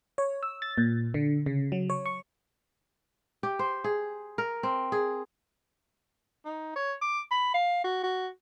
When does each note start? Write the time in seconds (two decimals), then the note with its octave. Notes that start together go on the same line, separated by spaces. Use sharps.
0.18 C#5
0.43 E6
0.62 A6
0.78 A#2
1.14 D3
1.46 C#3
1.72 F#3
1.90 C#5
2.06 C#6
3.43 G4
3.59 C5
3.84 G#4
4.38 A#4
4.63 C4
4.92 G#4
6.45 D#4
6.76 C#5
7.01 D6
7.31 B5
7.54 F5
7.84 F#4
8.03 F#4